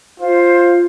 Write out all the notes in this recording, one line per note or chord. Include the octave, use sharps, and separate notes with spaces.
F4 C5